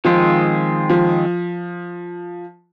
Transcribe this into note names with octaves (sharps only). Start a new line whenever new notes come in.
D#3 F3 G#3 C4 F4
F3